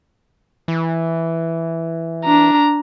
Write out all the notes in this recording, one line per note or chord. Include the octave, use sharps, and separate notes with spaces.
E3
D4 A#5